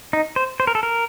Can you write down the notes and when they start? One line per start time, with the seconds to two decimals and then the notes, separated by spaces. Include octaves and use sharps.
0.13 D#4
0.36 C5
0.60 C5
0.67 A#4
0.75 A4
0.83 A#4